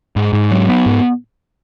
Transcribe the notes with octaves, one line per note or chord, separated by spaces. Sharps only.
G#2
G#2
F#3
B3
G#2